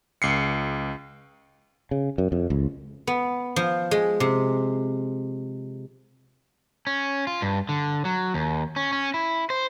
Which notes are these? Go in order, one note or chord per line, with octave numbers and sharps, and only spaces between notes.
C#2 C7 C#7
C#3
F#2
F2
C#2
B3
F3
G#3
C3
C#4
F4
G2
D3
F#3
D#2
C#4
C#4
E4
C5